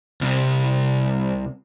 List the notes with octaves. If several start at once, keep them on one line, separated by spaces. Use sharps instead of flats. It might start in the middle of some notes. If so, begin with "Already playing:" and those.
C2 C3